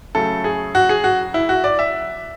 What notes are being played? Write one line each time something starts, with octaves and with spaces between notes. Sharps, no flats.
C#3 F#3 A3 A4
G#4
F#4
G#4
F#4
E4
F#4
D5
E5